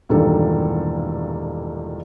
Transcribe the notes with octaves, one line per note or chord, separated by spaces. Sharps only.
E1 G2 A#2 D#3 D4 A4